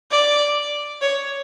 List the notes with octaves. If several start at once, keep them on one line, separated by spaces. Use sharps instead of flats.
D5
C#5